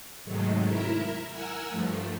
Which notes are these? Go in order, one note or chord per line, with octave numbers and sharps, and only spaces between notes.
G#2 C3 D#3 F#3 G#3 A3
E4 A#4 E5
A#4 F#5 G#5 E6
G2 F3 A3